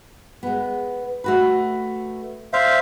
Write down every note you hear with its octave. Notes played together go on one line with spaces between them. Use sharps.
G#3 B3
A3 F#4 B4
C5 D5 E5 F5